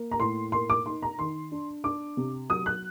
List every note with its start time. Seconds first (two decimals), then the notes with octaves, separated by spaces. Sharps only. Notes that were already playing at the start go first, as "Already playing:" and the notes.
Already playing: A#3
0.11 A#5
0.20 A2 C6
0.52 A#3 C6
0.70 D6
0.85 D#4 C6
1.02 A#5
1.18 D#3 C6
1.52 D4
1.84 D4 D6
2.17 C3
2.50 F#3 D#6
2.66 F#6